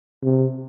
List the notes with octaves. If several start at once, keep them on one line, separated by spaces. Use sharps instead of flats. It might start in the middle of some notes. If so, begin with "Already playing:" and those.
C3